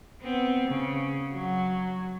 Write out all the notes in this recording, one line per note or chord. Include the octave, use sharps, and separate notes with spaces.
B3 C4
C#3
F#3